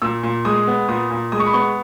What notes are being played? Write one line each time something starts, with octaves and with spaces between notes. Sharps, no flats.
A#2 E6
A#2
G#3 D#6
B3
A#2 D#6
A#2
G#3 D#6
C#6
B5
B3 C#6